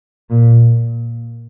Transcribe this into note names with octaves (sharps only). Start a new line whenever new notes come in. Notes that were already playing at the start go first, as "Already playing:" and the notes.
A#2